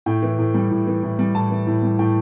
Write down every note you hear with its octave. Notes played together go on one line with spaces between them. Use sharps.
A2 G5
E3
A2
G3
A2
E3
A2
G3
A2 A5
E3
A2
G3
A2 G5